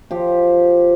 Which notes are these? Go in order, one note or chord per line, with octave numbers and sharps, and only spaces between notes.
F3 G4